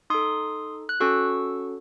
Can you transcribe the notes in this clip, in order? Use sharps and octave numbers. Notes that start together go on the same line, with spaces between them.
D#4 A4 C6 D#6
F#6
C#4 F#4 A4 C#6 E6